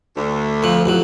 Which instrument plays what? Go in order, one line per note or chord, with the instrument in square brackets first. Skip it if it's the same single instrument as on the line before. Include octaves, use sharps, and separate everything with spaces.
[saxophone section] D2
[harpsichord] F2 F3
A1 F2 F#3